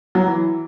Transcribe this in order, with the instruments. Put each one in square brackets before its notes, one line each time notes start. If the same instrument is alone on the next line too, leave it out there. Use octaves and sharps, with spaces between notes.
[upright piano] F#3
E3